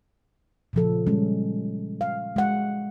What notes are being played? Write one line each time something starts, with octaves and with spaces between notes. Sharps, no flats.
A#2 C#3 F3 A4
G3 G#3 C#4
F5
G#3 F#5